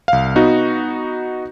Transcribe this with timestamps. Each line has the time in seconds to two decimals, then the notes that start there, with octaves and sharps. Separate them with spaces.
0.08 C2 F5
0.36 B3 D#4 F#4